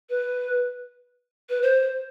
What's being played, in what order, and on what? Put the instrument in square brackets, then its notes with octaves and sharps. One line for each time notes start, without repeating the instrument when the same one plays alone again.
[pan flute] B4
B4
C5